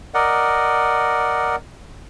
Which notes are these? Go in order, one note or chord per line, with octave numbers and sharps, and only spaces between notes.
A#4 D5 D#5 F#5